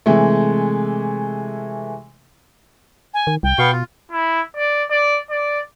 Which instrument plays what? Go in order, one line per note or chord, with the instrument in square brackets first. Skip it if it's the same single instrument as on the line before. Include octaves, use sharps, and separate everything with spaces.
[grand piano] C3 E3 G#3 A3
[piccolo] G#5
[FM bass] D#3
[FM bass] C2 [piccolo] G5
[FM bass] B2 [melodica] B3 F5 C#6
[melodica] F4
[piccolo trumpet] E4
D5
D5
D5